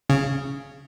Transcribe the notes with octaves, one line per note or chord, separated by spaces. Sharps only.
C#3